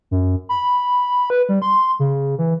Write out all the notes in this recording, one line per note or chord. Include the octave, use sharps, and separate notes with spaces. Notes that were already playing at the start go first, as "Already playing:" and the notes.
F#2
B5
B4
G3
C6
C#3
E3